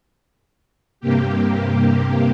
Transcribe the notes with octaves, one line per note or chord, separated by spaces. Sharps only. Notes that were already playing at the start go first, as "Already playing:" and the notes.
G2 C3 A#3 G4